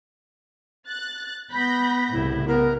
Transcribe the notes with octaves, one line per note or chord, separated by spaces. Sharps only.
F#6 A6
B3 B5 G6 A#6
C2 A2 C#3 E4
B3 A#4